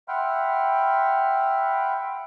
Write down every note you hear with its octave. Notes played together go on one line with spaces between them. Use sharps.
E5 F#5 G5 B5 C6 F6